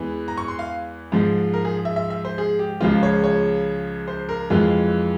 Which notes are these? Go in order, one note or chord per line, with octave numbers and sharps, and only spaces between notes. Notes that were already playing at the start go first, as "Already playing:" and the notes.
Already playing: E2 E3 G#3
A#5
C#6
C6
F5
G#2 F3 G#3
A#4
G#4
E5
E5
E5
C5
G#4
G4
C#2 C#3 F3 G#3 F4
C#5
C#5
C5
A#4
F2 E3 G#3 F4